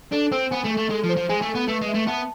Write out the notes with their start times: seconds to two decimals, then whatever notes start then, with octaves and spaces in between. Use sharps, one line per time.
0.12 D4 A4
0.32 C4 C5
0.50 B3 G#5
0.64 A3
0.71 A4
0.77 A3
0.90 G#3 A4
1.03 F3
1.09 C5
1.16 F3
1.29 G#3 G#5
1.42 A3
1.49 A4
1.55 B3
1.68 A3 B4
1.81 G#3
1.88 E5
1.94 A3
2.07 B3 A5